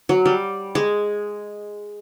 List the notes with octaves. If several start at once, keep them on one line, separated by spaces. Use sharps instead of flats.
F#3
G3
G#3